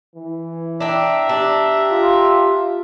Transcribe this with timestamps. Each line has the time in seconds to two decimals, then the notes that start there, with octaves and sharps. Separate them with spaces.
0.16 E3
0.80 D4 E5 G5 A#5
1.29 D4 G4
1.92 F4